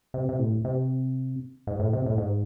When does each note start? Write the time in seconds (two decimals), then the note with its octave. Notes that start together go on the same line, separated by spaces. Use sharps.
0.14 C3
0.29 C3
0.39 A2
0.64 C3
1.67 G#2
1.80 A2
1.93 C3
2.06 A2
2.18 G#2